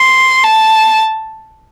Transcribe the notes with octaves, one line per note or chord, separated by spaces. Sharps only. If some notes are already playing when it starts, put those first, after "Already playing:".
Already playing: C6
A5